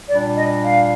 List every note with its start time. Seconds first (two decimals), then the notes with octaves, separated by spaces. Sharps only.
0.10 A#2 G3 D4 D5
0.37 D#5
0.65 F5